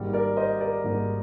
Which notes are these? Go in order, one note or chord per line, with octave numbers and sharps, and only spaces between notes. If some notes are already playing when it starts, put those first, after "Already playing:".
Already playing: G#1 G#2 G3 A#3
A#4 D5
C5 D#5
A#4 D5
G#1 G#2 G3 A#3